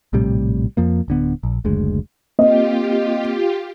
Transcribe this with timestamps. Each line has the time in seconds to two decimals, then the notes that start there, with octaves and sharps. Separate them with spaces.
0.13 A#1 A2 C3 G3
0.77 F2 F3 A#3
1.08 D1 D3 B3
1.43 A#1
1.65 F#1 D2 G#3
2.39 A#3 C4 F4 G4 D#5